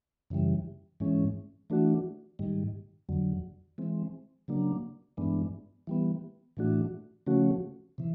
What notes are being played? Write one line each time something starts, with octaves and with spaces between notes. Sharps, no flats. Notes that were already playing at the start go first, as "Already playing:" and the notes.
F#2 C#3 E3 G3
G#2 E3 G#3 C#4
E3 A3 D4 F#4
G#2 D#3 G3
F2 D3 F#3
E3 G#3 C4
C#3 F#3 A#3 D4
G2 E3 G#3 B3 D4
E3 G3 B3
A2 E3 A3 D4 F#4
C#3 F3 A3 C#4 F#4
C3 E3